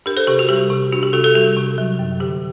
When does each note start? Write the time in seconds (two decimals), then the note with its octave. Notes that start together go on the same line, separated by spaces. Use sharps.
0.06 D4 G4 A#4
0.17 A4 C5
0.27 C3 G4
0.39 F#4
0.49 G3 G4
0.70 C3
0.92 D4 F#4
1.03 G4
1.13 C3 F#4 A4
1.24 F#4 A4
1.34 G3 F#4 A4
1.57 C3
1.78 F#3
1.99 F#2
2.20 D3 G4